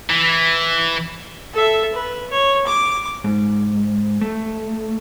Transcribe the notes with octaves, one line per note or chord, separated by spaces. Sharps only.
E3
A4 E5
B4
C#5
D6
G#2
A3